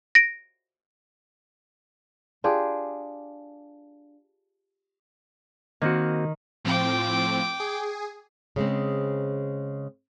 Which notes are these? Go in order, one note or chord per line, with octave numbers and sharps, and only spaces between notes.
A#6 D7
D4 F4 G4 G#4
D#3 A#3 C4 F#4
A2 F3 C4 G5 D6
G#4
C#3 G#3 C4